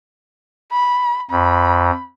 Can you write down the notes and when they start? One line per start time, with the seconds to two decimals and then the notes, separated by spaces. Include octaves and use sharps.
0.72 B5
1.31 F2 B5